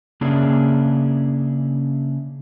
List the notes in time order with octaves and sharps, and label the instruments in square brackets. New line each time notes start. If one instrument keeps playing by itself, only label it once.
[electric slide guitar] C#3 A#3 C#4 D4 E4 G#4